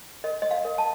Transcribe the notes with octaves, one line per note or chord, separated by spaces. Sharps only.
A#4 D#5
D#5
F5
A#4
A5